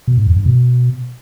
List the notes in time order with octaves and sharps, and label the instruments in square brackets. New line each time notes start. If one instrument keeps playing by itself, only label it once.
[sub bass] B2
G#2
E2
G2
B2